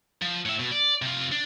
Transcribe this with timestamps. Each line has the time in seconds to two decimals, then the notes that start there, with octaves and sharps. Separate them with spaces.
0.22 F3
0.46 A2 E5
0.60 B2
0.71 D5
1.02 C3 F4
1.32 D4